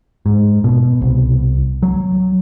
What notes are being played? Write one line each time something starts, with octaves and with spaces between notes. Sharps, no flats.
G#2
B2
C2
F#3